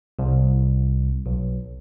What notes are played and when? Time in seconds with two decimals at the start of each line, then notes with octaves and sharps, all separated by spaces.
0.19 C2
1.26 B1